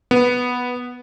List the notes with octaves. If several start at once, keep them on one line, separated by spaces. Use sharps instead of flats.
B3